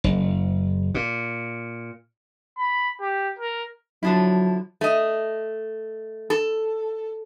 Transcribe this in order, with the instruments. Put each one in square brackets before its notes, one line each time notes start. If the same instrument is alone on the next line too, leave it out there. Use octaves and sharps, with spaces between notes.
[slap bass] F#1
A#2
[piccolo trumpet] B5
G4
A#4
[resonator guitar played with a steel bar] D3 F3 E4 [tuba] F#3
[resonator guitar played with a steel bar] A3 D#5
A4